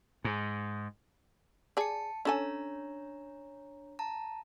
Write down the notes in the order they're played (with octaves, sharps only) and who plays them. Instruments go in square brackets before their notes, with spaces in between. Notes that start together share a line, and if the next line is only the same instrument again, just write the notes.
[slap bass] G#2
[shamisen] G#4 D5 [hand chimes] A5 C#7
[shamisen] C#4 A4 G#5 [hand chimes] D4 C#5 A#5
[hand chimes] A5 A#5